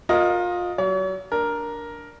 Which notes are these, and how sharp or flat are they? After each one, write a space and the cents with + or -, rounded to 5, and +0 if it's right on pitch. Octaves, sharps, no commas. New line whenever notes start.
F4 +25 A#4 +0 D#5 +0
F#3 +30 C#5 +40
D4 +0 A#4 +5